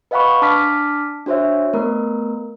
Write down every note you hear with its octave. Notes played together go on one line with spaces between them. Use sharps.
B4 D#5 F5 F#5 B5 C#6
D4 A5 D6 F6 B6
D4 F#4 C5 C#5 E5
A3 B3 A#4